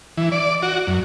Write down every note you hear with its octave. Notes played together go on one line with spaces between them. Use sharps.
E3
D5
F#4
F#2